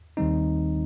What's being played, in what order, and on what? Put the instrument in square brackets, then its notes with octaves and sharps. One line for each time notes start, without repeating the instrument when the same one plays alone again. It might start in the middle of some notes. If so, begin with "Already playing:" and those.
[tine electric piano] D#2 D#3 G3 C4 D#4